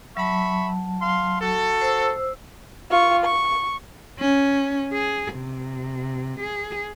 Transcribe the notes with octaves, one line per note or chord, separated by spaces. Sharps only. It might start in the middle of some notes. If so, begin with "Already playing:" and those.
F#3 E5 A5 B5 C#6
F5 C6
F#4 A4
C5 E6
F4 C#6
C#6
C#4
G#4
C3
G#4